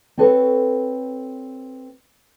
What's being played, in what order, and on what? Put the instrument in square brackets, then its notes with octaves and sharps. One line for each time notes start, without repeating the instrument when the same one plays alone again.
[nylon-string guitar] C4 F#4 A4 B4 C#5